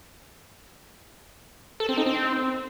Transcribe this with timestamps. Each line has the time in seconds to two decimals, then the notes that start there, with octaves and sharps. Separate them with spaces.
1.80 A4
1.89 C4
1.97 D#4
2.06 C4